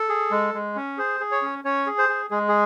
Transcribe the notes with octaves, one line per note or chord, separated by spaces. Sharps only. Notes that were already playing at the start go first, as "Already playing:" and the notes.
Already playing: A4
G#4
G#3
G#3
C#4
G#4 C5
G#4
C#5
C#4
C#4 C#5
G#4
C5
G#4
G#3 G#4
G#4